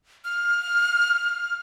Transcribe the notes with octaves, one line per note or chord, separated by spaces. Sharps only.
F6